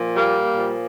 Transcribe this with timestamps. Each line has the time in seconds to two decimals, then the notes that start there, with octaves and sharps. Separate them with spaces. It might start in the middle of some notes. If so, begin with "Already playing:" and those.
Already playing: A#2 F3
0.16 G3 A#3
0.56 A#2 F3